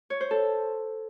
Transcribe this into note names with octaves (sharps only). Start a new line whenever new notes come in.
C#5
C5
A4